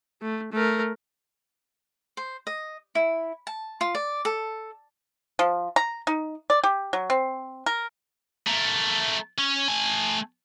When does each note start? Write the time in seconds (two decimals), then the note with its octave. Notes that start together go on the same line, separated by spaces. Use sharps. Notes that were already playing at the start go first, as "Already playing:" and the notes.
0.22 A3
0.53 A3 A#4
2.17 C5
2.47 D#5
2.95 E4
3.47 A5
3.81 F4
3.95 D5
4.25 A4
5.39 F3
5.76 A#5
6.07 D#4
6.50 D5
6.63 G4
6.93 F#3
7.10 C4
7.66 A#4
8.47 A3 A#4
9.38 C#4
9.68 A3 G#5